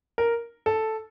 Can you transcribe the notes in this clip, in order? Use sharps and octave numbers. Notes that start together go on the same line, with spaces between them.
A#4
A4